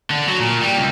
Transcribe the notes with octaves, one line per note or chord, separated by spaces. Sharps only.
D3
F#3
A#2
G3
C#2